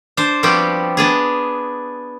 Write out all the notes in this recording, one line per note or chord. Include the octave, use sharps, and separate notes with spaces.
D4 C5
F3 G3 B3 C4 F#4 G4
B3 D4 G#4